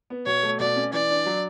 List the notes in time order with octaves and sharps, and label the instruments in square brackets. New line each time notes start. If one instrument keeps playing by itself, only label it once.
[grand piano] B3
[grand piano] B2 [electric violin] C#5
[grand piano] A3
[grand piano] B2 [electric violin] D5
[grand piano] C#4
[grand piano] E3 [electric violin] D5
[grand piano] D4
F#3